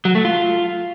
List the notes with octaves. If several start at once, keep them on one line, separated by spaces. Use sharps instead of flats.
F#3
A3
F4